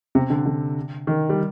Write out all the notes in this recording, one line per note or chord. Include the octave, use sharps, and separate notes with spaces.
C3
D3
D3
D#3
G3